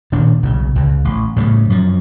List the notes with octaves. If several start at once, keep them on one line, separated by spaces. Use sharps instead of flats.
D#1 A#2 D#3 D4
B1 C#3
C#2
A1
A2 C#3 E3 G3
F#2 F3